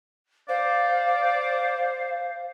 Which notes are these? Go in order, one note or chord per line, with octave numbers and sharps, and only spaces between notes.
C5 D5 F5